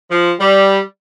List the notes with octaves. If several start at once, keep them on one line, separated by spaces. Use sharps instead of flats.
F3
G3